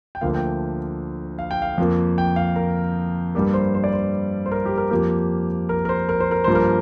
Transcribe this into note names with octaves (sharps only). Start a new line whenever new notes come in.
G5
D2 D3 F3 A#3 F5
G5
F5
G5
F5
F2 F3 A#3
G5
F5
A#4
G2 G3 A#3 G4
C5
C5
D5
C5
C5
A#4
G4
A#4
F2 F3 A#3 G4
A#4
A#4
C5
A#4
C5
A#4
G2 F3 A#3 C5
A#4